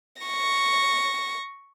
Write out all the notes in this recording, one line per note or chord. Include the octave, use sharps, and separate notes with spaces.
C#6 A#6